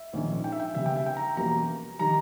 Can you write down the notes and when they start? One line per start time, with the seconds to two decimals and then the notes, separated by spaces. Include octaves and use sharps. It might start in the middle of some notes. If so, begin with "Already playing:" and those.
Already playing: E5
0.13 A#1 G#2 D#3 G#3 C#4
0.44 G5
0.52 E5
0.60 G5
0.75 D#2 C#3 G3 B3 E5
0.86 G5
0.96 E5
1.06 G5
1.17 A#5
1.37 E2 B2 G3 A#3 C#4 A#5
1.99 D#3 G3 A#5